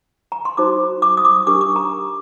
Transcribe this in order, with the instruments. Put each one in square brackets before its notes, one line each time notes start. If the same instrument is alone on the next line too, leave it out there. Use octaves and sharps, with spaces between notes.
[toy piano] A#5
C6
D#4 F#4 C5 D6
D6
D#6
D6
D4 G4 A#4 D6
D6
A#5